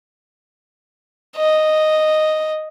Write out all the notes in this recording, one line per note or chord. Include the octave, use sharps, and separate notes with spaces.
D#5